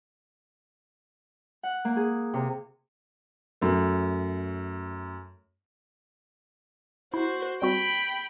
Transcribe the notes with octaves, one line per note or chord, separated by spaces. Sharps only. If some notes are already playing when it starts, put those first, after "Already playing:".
F#5
A#3
G#4
C3
F#2 A3
E4 F#4 C5
G3 C4 F#4 G5 B5